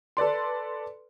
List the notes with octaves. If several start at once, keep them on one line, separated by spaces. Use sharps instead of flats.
A4 B4 D5 C6